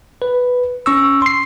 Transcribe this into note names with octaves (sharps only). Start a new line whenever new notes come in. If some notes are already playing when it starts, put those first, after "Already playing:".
B4
C#4 C#6 E6
C6 C7